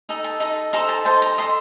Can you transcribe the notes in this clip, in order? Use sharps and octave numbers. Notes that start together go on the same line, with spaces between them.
D#4 A4 D#5
A5
D#4 A4 D#5
D#4 A4 C5 A#5
A5
D#4 A4 C5 A5
A#5
A4 D#5 C6